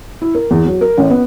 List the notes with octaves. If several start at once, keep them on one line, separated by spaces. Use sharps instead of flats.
E4
A#4
E2
F#3
A#4
A1
B3